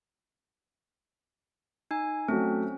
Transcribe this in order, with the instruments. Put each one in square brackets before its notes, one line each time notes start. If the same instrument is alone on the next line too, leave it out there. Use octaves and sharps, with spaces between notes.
[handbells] D#4 G#5
[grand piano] F#3 A3 [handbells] C4 C#4